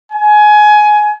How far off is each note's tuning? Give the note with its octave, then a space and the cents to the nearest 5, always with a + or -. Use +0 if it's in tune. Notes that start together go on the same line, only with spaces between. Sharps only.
G#5 +20